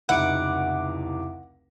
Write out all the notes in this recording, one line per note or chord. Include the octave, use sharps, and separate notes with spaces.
F1 C#2 D#4 E4 F#5 D6